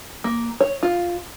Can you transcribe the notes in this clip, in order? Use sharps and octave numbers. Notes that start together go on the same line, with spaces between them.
A#3
C#5
F4